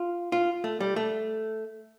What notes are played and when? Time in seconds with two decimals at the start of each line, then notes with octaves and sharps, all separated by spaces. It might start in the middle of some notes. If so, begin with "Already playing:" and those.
Already playing: F4
0.32 F4
0.64 A3
0.80 G3
0.96 A3